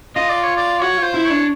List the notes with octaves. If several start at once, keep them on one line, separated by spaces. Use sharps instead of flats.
F4 D#5
D5
C#5
D5
F#4 C#5
F4
C5
E4
D4 C#5